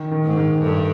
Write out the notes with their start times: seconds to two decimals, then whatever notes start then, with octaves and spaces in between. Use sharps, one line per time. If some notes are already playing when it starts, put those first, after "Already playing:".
Already playing: D#3
0.11 D#3
0.24 G#2
0.37 D#3
0.62 G2 A3